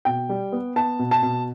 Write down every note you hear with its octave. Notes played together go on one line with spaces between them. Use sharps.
B2 G5
G3
B3
B3 A5
B2
A5
B2